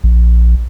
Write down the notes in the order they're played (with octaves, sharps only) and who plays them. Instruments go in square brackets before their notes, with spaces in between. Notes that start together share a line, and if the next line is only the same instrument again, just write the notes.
[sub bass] A#1